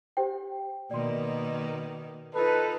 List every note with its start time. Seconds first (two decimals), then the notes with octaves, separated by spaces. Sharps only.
0.17 G4 C5 G5
0.91 B2 D#3 A#3 D5 C6
2.34 D#4 F4 A4 B4